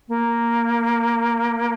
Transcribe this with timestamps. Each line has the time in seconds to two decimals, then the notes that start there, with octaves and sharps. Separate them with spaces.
0.08 A#3